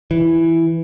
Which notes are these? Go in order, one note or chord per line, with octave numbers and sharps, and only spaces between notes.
E3